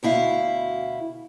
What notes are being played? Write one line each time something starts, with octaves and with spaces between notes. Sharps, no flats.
D2 B2 E4 F5